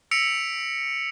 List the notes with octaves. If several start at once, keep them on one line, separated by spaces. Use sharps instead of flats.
E6 A#6 B6 C#7 D7 F7